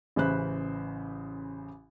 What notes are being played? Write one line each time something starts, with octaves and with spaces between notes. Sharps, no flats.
A1 C#3 E3 C5 B5 F#6